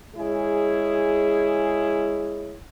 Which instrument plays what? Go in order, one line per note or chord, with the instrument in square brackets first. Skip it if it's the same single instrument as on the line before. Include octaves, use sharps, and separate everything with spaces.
[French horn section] G#3 C#4 E4 G#4